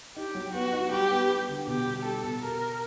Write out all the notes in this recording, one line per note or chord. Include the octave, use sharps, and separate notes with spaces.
D#4 G4
F#3
B3 F#4
D#4
G3 G4
B3
G3
D3
B2 G4
G3
G3 A4
B2
G4 A#4
G4